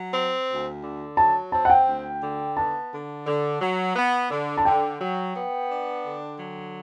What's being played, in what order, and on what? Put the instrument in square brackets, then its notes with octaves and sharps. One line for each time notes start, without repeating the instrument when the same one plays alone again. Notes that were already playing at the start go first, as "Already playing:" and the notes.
Already playing: [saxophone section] F#3
C4
D2
D3
[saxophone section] F#3 [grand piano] A5
[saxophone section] C4 [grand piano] A5
[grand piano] F#5
G5
[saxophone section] D2
D3
[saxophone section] B3 [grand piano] A5
[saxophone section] D3
D3
F#3
B3
D3
[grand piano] A5
[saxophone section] D3 [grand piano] G5
[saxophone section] F#3
B3
D4
D3
F#3